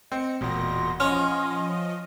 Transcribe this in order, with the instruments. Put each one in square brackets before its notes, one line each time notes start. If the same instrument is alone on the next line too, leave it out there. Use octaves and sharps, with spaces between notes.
[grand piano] C4 [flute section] D#5 [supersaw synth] C#7
[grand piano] E1 [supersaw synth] A#2 A#6 [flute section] F#5 C6
[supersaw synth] F3 D#5 [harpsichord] C#4 [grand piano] F6